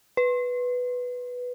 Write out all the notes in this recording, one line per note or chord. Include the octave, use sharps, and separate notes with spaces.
B4